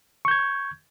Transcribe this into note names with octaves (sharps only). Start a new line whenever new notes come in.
C#6 G6 G#6